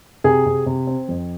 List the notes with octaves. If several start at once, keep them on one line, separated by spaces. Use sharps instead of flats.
C3 G#4 G#5
C3
C3
C4
F2